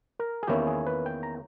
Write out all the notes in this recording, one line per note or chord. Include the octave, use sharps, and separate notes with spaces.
A#4
G#4
E2 D#3 A#3 C#4 E4 G4
G#4
B4
G5
A#5